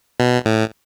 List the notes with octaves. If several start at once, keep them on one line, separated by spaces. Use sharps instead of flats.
B2
A2